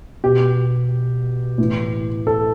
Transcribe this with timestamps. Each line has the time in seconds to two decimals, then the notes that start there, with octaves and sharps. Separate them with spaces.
0.24 B2 G4
1.58 A2 E3
2.27 A4